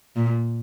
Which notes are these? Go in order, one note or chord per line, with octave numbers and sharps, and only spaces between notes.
A#2